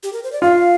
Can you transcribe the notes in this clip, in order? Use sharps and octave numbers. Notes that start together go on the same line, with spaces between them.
G4
A#4
C5
D5
F4 F5